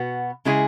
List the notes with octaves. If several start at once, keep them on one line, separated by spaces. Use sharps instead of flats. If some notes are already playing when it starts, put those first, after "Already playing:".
Already playing: B2 B3 F#4
C#3 G#3 E4 G#4